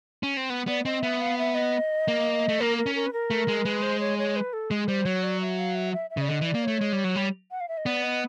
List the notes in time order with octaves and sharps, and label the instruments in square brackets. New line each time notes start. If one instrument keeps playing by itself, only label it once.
[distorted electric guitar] C#4
C4
B3
[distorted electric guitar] B3 [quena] D5
[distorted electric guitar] C4 [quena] D#5
[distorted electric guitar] B3 [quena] E5
[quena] F5
E5
D#5
[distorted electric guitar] A#3
A3
[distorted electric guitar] A#3 [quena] A#4
[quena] A#4
[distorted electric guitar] C#4
[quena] A#4
B4
A#4
[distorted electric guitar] A3
G#3
[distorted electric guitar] G#3 [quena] B4
[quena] C5
C#5
C#5
B4
A4
[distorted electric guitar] G#3 [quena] G#4
[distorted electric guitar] G3 [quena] C5
[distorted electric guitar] F#3 [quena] C#5
[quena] D5
E5
F5
E5
E5
E5
[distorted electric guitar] C#3 [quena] D5
[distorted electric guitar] D3 [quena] D#5
[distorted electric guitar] E3
[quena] D5
[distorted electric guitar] A#3
[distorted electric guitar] A3 [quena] C#5
[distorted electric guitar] G#3
G3
F#3
G3
[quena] F#5
F5
E5
D#5
[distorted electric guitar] B3 [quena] D5
[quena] D#5